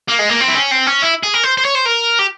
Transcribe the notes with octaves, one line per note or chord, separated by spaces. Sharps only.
A#3
G#3
A#3
C4
E4
C#4
C4
C#4
E4
G#4
A#4
C5
C5
C#5
C5
A#4
G4